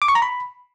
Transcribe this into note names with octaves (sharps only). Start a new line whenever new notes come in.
D6
C#6
A#5
B5